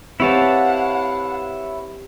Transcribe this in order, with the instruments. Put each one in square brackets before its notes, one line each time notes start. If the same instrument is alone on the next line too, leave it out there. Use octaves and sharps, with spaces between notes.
[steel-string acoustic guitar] C4 G4 B4 [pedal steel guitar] E4 C#5 A5 [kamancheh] F5 F#5